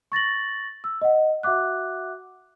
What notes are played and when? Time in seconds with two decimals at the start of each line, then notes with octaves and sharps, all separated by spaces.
0.12 C#6 A6 A#6 F#7
0.84 E6
1.02 D#5 F#5
1.43 F#4 E5 F#5 D6 F#6